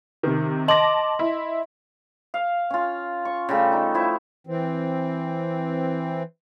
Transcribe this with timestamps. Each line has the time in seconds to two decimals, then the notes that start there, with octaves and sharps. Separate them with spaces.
0.23 C3 D#3
0.68 D#5 A5 C6 D6 A#6 F#7
1.19 E4
2.34 F5
2.70 C#4 F4
3.25 C#6
3.49 C#3 G3 A3
3.72 D#4
3.94 F3 E4 C5
4.47 E3 C4